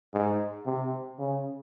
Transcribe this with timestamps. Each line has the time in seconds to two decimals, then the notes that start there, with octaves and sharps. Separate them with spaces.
0.14 G#2
0.66 C3
1.19 C#3